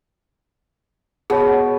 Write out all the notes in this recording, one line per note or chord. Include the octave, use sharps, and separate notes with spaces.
B2 G#4 C#5